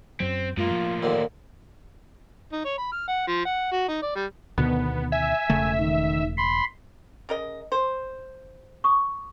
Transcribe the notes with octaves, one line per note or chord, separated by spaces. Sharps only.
F#2 F#3 C4
F#2 A2 G#3 A#3 F4
F3
D#2 A#2 D3
D#4
C#5
B5
F6
F#5
F3
F#5
F#4
D#4
D5
G3
D2 B2 D#3 B3
E5 G#5
E1 C#3 A3
D#3
B5 C6
C#3 A#4 D#5
C5
C#6 D#6